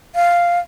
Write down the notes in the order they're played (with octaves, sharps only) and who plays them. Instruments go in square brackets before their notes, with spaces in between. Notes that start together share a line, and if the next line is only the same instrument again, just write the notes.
[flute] F5